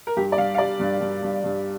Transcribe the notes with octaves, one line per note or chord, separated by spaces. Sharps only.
A#4
G2 G4
D5
G2 F5
F5
G3 D5
G2
G2
G2
G2